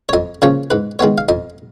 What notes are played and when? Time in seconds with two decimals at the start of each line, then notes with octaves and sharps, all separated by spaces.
0.09 C#5
0.13 F2 D#5
0.42 C#3 F3 A#3 C#4 C#5
0.70 G#2 B4
0.99 D#3 G#3 B3 C#5
1.18 F5
1.29 F2 D#5